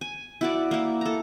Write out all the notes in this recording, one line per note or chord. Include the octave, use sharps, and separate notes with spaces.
G#5
E4 F#4 D5
A#3 E4
A4 A#5